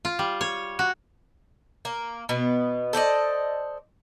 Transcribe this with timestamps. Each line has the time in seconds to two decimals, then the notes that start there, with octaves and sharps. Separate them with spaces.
0.05 F4
0.19 G3
0.41 C#5
0.79 F#4
1.85 A#3
2.29 B2 B3
2.93 A4 C5 D5 D#5